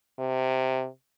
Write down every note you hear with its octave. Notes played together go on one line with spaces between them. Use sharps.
C3